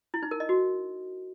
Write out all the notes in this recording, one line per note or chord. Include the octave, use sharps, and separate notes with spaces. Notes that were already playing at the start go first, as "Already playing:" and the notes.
E4
D#4
A#4
D#5
F#4